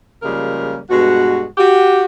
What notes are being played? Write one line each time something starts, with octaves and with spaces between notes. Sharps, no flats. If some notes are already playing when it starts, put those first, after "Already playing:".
C#3 F3 G3 G#3 A#3 A#4
G2 B2 G#3 F#4
F#4 G4